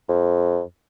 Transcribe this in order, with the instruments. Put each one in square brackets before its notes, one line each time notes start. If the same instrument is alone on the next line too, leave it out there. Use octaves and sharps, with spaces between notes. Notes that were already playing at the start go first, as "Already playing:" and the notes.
[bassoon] F2